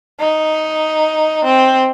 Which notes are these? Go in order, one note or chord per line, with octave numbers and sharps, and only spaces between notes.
D#4
C4